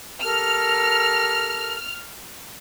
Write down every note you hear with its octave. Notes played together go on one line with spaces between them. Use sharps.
G4 A4 A#4 F6